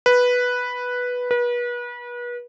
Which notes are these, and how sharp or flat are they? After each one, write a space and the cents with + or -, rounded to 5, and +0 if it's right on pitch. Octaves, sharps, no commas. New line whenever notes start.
B4 -5
B4 -35